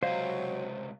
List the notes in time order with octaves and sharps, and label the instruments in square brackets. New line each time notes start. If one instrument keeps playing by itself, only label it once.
[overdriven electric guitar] C#2 C3 [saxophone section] F#3 [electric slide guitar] C5 [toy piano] D5 D#5 F5